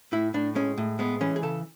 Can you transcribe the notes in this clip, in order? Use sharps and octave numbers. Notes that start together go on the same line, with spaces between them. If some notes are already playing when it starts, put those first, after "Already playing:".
A2 E4
A2 D4
G#3 C#4
A2
G#3 B3
E3 C#4
G#4
C#3 A4